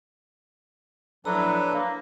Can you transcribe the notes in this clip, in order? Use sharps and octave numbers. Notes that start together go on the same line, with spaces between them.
A2 F3 F#3 D4 A4 B4 A#5
A#3